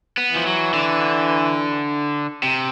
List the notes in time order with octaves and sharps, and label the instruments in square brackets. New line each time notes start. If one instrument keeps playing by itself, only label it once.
[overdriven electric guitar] B3
[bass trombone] E3 [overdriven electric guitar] F3
[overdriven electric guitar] F#3
D3
C3